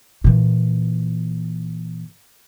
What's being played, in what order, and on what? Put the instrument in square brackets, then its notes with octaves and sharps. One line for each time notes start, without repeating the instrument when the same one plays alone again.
[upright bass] A#2 E3